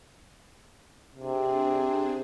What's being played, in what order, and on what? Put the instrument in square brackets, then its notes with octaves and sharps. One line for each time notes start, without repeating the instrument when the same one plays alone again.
[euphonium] C3 [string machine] C4 D4 G#4